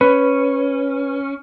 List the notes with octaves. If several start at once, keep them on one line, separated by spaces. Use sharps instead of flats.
C#4 B4